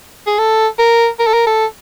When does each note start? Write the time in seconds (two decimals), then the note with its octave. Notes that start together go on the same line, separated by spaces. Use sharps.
0.27 G#4
0.39 A4
0.79 A#4
1.19 A#4
1.27 A4
1.34 A#4
1.47 A4